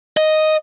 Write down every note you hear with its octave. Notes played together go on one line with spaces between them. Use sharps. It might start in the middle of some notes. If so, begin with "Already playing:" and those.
D#5